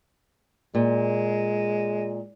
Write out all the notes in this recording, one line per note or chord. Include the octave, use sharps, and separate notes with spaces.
A#2 G#3